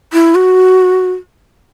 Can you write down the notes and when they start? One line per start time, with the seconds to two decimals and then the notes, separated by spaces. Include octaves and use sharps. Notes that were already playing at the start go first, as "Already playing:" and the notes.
0.13 E4
0.35 F#4